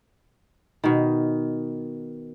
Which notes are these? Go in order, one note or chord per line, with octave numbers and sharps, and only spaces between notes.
B2 D#3